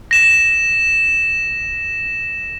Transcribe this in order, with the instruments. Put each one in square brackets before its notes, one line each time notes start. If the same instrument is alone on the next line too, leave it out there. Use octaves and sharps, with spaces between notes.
[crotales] A#6 E7